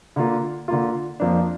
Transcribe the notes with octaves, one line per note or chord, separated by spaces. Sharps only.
D3 A#3 F4
D3 A#3 F4
F2 F3 A#3 D4